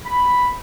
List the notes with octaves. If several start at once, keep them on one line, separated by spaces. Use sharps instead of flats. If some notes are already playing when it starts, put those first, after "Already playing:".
B5